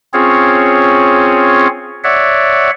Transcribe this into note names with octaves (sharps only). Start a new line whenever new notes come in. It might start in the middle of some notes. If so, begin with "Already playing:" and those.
C4 C#4 F4 G#4 C#5
C#5 D5 E5 F#5